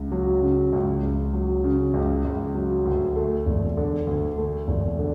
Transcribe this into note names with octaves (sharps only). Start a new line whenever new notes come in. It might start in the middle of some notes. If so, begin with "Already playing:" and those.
Already playing: C#2
F#3
C#3
C#2
C#2
F#3
C#3
C#2
C#2
F#3
D2
A3
E1
D3
D2
A3
E1
D3